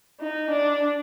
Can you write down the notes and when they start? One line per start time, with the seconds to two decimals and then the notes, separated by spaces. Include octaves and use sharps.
0.20 D#4
0.50 D4